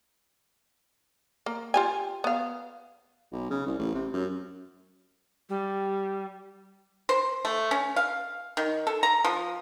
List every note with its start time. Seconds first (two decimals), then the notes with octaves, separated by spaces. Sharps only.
1.46 A#3
1.74 F4 G4 G#5
2.24 B3 F5
3.32 B1
3.50 C#3
3.66 C2
3.79 A1
3.95 C3
4.14 F#2
5.49 G3
7.09 C5
7.45 A3
7.71 C#4
7.96 F5
8.57 D#3
8.87 A4
9.03 A#5
9.25 F3